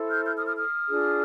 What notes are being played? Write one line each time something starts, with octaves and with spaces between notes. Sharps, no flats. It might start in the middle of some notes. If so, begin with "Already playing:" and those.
Already playing: E4 A4 C5
F6 G6
F6 G6
D#6 F6
D#6 F6
D#6 F6
D4 F4 G#4